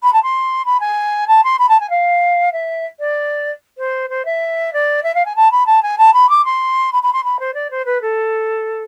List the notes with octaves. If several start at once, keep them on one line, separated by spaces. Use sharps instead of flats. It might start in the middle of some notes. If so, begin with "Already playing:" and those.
B5
A5
C6
B5
G#5
A5
C6
B5
A5
G#5
F5
E5
D5
C5
C5
E5
D5
E5
F5
G#5
A5
B5
A5
G#5
A5
B5
D6
C6
B5
B5
C6
B5
C5
D5
C5
B4
A4